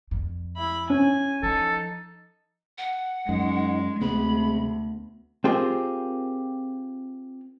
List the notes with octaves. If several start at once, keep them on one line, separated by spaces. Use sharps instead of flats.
F2
E4 B5
C#4 G#5
F3 D#4 A4
F#5
F#2 G#3 D#4
D2 C3 G#3 B3 B5
C4 F4 G4 G#4 A#4